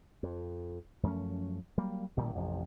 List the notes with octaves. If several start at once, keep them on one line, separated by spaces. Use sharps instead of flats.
F2
F#2 F3 A3 C#4
F#3 G3 A#3
A1 A#2 D#3 G3
A1 F2 C3